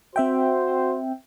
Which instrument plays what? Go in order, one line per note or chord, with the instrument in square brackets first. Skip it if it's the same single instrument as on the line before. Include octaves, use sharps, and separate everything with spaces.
[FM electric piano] C4 E5 G5 [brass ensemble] F#4 C5